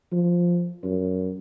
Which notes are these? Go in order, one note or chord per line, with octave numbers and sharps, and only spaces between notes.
F3
F#2